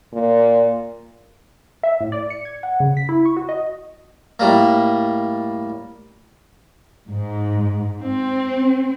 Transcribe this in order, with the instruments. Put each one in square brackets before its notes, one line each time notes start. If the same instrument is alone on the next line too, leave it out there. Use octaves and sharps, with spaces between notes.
[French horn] A#2
[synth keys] E5
A2
D5
C#7
G#6
F#5
C#3
B6
E4
C#6
F#4
D#5
[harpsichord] A2 G3 A#3
[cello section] G#2
C4